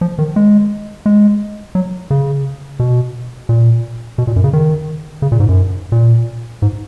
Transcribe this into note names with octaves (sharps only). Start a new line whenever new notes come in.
F3
D#3
G#3
G#3
F#3
C#3
B2
A#2
B2
A#2
F#2
C#3
D#3
C#3
A#2
G#2
F#2
A#2
G#2